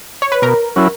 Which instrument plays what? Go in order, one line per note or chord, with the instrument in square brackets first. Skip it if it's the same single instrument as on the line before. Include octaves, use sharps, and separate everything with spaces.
[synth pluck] C#5
B4
[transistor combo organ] B2 [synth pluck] A#4
[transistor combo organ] F#3 C#4 E4